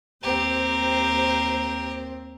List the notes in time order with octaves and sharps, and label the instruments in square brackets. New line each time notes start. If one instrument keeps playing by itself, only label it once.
[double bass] D#2 C4 [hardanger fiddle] G4 A#4 [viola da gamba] C5